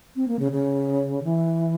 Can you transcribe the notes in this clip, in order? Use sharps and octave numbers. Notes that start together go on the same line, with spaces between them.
C4
A#3
C#3
C#3
E3